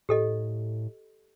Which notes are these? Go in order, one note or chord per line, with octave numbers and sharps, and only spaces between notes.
A2 G4 A4 D#5